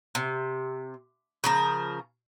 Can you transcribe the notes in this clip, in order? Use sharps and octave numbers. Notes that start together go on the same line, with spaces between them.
C3
C#3 F3 A#4